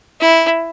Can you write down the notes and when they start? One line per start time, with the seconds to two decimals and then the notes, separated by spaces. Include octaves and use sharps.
0.21 E4